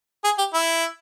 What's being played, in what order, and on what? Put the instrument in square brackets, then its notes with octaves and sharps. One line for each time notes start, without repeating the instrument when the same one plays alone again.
[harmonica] G#4
G4
E4